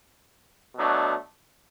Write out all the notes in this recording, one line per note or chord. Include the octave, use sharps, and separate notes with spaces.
B2 F#3 A3 D4